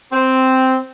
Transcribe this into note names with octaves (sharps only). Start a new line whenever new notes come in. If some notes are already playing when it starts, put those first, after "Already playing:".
C4